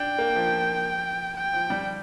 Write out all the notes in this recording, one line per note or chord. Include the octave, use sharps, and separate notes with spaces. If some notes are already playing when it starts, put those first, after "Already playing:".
Already playing: D4 G5
A#3
F3
G5
F3
G3